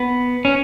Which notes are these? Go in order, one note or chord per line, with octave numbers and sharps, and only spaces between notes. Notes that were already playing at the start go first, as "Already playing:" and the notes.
Already playing: B3
C#4